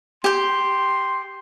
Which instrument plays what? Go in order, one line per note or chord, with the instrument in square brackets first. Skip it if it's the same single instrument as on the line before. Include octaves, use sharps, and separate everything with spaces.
[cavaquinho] G4 G5 [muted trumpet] C6